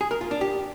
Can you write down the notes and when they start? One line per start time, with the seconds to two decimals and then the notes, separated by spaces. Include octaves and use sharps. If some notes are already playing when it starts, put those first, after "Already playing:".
0.01 G#4
0.11 A#4
0.21 F4
0.31 D4
0.41 G4